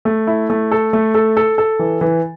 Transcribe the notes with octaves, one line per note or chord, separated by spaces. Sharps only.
A3
E4
A3
A4
A3
A4
A4
A4
E3
E3